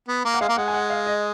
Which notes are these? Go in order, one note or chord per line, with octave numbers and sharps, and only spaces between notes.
B3
A#3
F#5
G#3 F5
A#3
G#3 F#5
G#5
F#5
F5
D#5